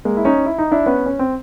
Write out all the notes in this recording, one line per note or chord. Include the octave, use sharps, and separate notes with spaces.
G#3 A#3
E4
C#4 D#4
E4
D#4
D4 E4
B3 C#4
C#4
C4